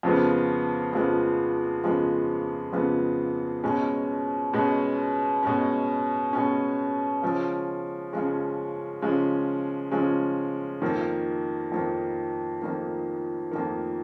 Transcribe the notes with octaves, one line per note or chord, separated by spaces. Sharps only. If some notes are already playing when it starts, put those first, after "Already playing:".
F2 C#3 F3 G#3 B3
F2 C#3 F3 G#3 B3
F2 C#3 F3 G#3 B3
F2 C#3 F3 G#3 B3
B2 G#3 C#4
B2 G#3 C#4
B2 G#3 C#4
B2 G#3 C#4
C#3 F3 G#3 C#4
C#3 F3 G#3 C#4
C#3 F3 G#3 C#4
C#3 F3 G#3 C#4
F2 D#3 A#3
F2 D#3 A#3
F2 D#3 A#3
F2 D#3 A#3